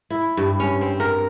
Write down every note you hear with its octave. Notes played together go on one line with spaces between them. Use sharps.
E4
G2
C#4
C4
A#4